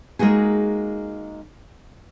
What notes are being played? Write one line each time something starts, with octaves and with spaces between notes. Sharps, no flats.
G#3 A#3 D#4 F#4 G#4